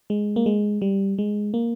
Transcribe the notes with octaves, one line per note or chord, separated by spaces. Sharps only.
G#3
A#3
G#3
G3
G#3
A#3